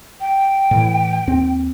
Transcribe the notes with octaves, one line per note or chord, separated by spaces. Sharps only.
G5
A2 E3
D#2 C4